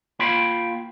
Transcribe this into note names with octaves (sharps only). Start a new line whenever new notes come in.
A#3 F4 G5 B5